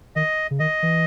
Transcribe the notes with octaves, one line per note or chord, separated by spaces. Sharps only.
D#3 D#5
C#3
D#3 D#5
E3